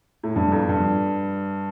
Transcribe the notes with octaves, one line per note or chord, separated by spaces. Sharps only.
A2
G2
F2
G2